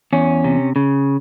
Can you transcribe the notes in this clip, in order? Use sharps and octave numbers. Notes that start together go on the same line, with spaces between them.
E2 C#4
C3
C#3